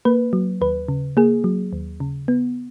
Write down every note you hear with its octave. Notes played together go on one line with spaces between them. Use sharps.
A#3 B4
F#3
D#2 B4
C#3
A#3 G#4
F#3
D#2
C#3
B3